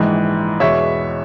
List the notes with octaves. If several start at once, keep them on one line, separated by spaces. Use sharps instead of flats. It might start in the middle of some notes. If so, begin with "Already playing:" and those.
Already playing: A#1 G#2 E3
E2 B2 G#3 B3 C#5 E5